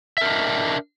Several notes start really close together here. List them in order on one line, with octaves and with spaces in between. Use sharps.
E5 A#4 D4 D#5